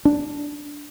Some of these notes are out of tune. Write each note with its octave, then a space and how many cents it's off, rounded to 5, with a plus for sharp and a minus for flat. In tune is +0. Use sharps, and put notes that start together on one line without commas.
D4 -5